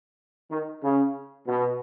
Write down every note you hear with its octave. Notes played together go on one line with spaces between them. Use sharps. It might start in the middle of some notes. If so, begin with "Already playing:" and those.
D#3
C#3
B2